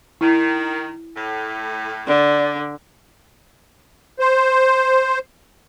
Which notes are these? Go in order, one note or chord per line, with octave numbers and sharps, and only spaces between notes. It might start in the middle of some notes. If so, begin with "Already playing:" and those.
D#3 E4
A2
D3 D5
C5